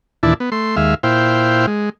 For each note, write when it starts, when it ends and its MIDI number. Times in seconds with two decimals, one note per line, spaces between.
0.23 0.34 39
0.23 0.34 46
0.23 0.34 52
0.23 0.34 62
0.23 0.34 64
0.23 0.34 81
0.40 0.50 59
0.52 0.76 57
0.52 0.76 84
0.76 0.95 39
0.76 0.95 56
0.76 0.95 76
0.76 0.95 77
1.03 1.66 46
1.03 1.66 64
1.03 1.66 72
1.03 1.66 77
1.03 1.66 79
1.67 1.90 56